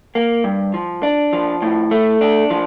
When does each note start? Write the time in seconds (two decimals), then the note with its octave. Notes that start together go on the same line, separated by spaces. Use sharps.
0.15 A#3
0.44 G2
0.74 F3
1.03 D4
1.33 F3
1.62 A2
1.91 A3
2.21 D4
2.51 F3